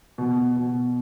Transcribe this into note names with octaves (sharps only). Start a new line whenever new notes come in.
B2
B2